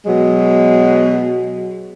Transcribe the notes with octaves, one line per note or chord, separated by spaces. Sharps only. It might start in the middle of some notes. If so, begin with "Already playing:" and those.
B2 F#3 G#3